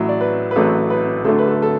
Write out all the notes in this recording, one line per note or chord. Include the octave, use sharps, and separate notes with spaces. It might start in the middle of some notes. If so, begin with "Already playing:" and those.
Already playing: A1 A2 F#3 E5
D5
B4
B4
A1 A2 F#3 A4
B4
D2 D3 F#3 A3 A4
B4
A4
A4